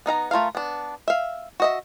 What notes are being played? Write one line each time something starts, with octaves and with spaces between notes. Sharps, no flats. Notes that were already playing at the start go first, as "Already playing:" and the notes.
B3 D#4 F5 A#5
A3 F4 A#4 F5
B3 D4
E5 F5
F#4 D#5 E5